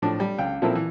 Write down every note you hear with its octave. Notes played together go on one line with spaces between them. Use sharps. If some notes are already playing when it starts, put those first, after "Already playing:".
A2 F3 D4
G3
C#2 G5
A#2 F3 C4 E4 A4 A#4
E3